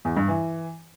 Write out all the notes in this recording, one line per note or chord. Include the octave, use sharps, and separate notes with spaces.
E2
G2
E3